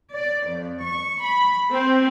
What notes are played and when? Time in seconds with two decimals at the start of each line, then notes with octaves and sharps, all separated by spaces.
0.13 D5
0.45 F2
0.83 C#6
1.22 B5
1.73 C4